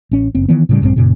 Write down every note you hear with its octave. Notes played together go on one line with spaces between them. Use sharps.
A1 C#4
F#1 C4
D#3 E3 B3
A2 C#3 G3
A#1 G2 C#3 C4
F#2 A#2 C#3